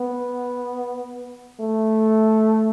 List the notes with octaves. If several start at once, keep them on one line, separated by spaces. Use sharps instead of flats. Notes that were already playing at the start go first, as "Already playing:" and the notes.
Already playing: B3
A3